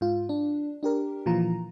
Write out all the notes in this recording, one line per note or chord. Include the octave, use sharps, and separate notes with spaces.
G#2 F4
D4
D4 G4 A#4
A#2 E3 F3 F4 A#5